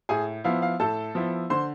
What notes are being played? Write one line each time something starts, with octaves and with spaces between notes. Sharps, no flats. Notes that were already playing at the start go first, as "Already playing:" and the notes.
A2 G#4 G#5
F3 B3 E4 F5
F5
A2 A4 A5
F3 B3 E4
D3 C5 C6